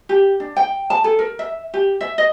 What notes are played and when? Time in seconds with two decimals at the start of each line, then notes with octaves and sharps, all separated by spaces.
0.09 G4
0.40 D4
0.56 G5
0.90 A5
1.04 A4
1.19 A#4
1.39 E5
1.74 G4
2.01 E5
2.18 D#5